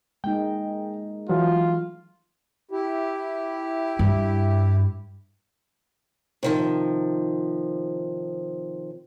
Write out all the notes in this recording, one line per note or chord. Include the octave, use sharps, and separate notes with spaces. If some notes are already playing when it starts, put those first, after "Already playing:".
G#3 A#3 D#4 G5
E3 F#3 F4
E4 G4
G2
C3 D#3 F3